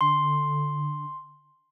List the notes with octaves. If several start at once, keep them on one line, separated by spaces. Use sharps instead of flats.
D3 C6